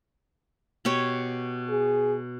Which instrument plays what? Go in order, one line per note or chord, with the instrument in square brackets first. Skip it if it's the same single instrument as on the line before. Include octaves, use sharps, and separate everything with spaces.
[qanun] B2 G4 C#5
[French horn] G#4